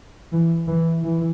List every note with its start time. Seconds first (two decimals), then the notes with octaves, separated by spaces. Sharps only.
0.32 E3
0.67 E3
1.02 E3